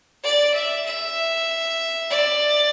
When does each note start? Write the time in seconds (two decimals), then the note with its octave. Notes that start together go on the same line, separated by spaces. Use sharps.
0.23 D5
0.54 E5
0.85 E5
2.11 D5